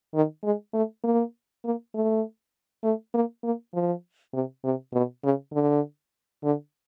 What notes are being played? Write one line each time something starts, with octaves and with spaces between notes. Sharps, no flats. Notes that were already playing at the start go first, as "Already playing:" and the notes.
D#3
G#3
A3
A#3
A#3
A3
A3
A#3
A#3
F3
C3
C3
B2
C#3
D3
D3